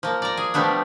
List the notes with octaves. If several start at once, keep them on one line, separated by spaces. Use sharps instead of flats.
F3 A#3
D5 A#5
G#4
F3 G3 A3 B3 D4